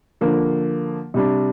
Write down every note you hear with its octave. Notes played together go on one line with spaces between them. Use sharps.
D3 F3 A#3
C3 G3 D4